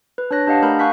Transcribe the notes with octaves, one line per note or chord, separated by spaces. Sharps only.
B4
D4 B4 C#5 F#6 A#6
D4 G4 D#5 F5 F#5 A5
A3 A#4 A#5 B5 G6
F5 G#5 C#6 F#6 G6 B6